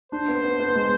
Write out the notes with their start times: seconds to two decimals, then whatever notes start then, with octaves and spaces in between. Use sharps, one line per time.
0.12 D4 C5
0.28 B3
0.43 B3
0.60 B3
0.75 G#3